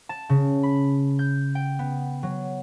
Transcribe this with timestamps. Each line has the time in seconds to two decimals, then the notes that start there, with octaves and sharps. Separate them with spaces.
0.09 A5
0.29 C#3
0.63 B5
1.19 G6
1.55 G5
1.79 B3
2.23 F#3